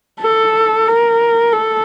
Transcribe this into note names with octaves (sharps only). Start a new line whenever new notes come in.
A4
A#4
A4